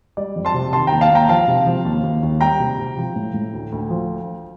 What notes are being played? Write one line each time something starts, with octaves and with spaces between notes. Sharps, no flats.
G3 D5
F2
A5 C6
C3
D#3 A5 C6
D#2 G5 A#5
F5 A5
D#2 G5 A#5
F3 F5 A5
C3
F3
D#2
D#2
D#2
G3 G5 A#5
C3
C3
F3
A2
A2
D2
D2
F3